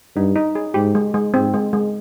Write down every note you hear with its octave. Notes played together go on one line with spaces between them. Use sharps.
G2 D#4
D#4
G#4
G#2 G4
G#3
G#3
G#2 C4
G#3
G#3